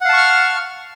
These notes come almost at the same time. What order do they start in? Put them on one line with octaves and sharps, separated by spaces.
F#5 F5 A5 C#6 F6